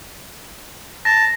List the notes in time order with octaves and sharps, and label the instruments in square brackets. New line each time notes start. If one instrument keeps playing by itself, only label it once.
[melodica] A5 [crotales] A#6